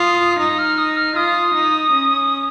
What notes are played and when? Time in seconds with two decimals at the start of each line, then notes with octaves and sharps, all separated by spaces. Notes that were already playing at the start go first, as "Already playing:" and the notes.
Already playing: F4 D#6
0.39 D#4 D#6
0.59 F6
0.78 D#6
0.97 F6
1.16 F4 D#6
1.55 D#4
1.93 C#4